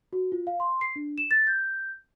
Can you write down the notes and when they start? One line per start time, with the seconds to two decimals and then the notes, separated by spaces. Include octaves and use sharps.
0.13 F#4
0.32 F4
0.47 F5
0.60 C6
0.81 C7
0.96 D4
1.18 E7
1.31 A6
1.47 G6